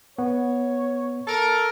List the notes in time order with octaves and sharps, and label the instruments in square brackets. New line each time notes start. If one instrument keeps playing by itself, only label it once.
[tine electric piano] B3 [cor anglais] C#5
[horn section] A4 A#4